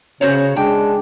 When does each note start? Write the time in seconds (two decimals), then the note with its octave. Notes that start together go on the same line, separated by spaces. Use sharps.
0.21 C#3 C#4 F#4 C5 C#5
0.56 G#3 D4 G5